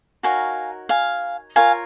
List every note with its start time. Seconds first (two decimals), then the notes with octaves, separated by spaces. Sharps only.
0.23 D#4 F#4 A#4 C#5 F5 G#5
0.89 F5 G#5
1.56 F4 A#4 C#5 F5 G#5